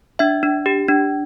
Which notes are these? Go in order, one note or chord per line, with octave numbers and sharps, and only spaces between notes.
D4 E5
D4
G4
D4